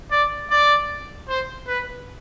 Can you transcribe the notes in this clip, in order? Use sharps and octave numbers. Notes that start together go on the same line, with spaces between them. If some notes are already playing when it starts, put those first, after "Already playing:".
D5
D5
C5
B4